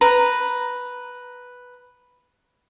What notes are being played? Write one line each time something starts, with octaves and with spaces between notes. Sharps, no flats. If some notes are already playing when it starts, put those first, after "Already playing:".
B4 A#5